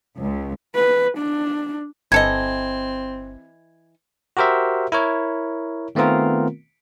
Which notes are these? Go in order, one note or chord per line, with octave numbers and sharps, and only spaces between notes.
C#2
B4
D4
G1 E3 C4 A4 D#5 G#6
F#4 G4 A#4 C5 E5
E4 A#4 C#5
D#3 A3 B3 C4 F4 A#4